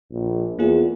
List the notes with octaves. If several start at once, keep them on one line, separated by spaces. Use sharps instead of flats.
A#1
E2 A#3 F4 G#4